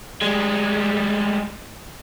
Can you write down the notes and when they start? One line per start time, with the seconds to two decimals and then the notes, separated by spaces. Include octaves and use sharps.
0.21 G3 G#3